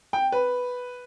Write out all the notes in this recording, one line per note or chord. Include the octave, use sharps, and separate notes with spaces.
G5
B4